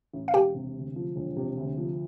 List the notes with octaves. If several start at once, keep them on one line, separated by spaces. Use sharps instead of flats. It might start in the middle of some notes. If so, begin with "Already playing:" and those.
A1
F5
E1 G4 G5
C3
D2
F3
E1
C3
D2
F3